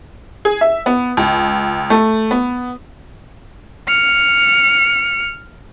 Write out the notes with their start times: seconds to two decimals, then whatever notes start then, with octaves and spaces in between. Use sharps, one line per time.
0.45 G#4
0.61 E5
0.86 B3
1.17 C#2
1.90 A3
2.31 B3
3.88 F6 C#7